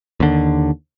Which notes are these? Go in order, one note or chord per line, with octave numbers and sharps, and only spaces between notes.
D#2 D3